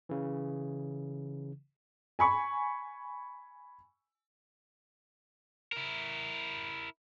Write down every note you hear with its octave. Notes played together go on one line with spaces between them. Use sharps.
C#3 E3
G#5 B5 C#6
E4 A#4